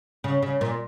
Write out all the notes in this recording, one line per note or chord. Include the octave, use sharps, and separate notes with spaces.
C#3
C#3
A#2